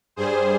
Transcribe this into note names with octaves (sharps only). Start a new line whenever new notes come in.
G2 G3 G#4 C5